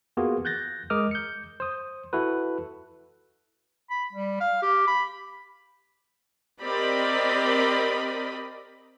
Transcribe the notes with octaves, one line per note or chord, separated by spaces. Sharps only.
A#3 B3 F4 F#4 G#4
F#6 G6 A6 A#6
G#3 A#4 D#5 D6 D#6 F6
G6 C#7
C5 D#6
E4 F#4 A4 B4
B5
G3
F5
G4
B5
C4 G4 A#4 D5 D#5 B5